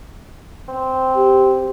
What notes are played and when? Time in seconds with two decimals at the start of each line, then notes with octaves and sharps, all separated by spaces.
0.68 C4
1.15 G4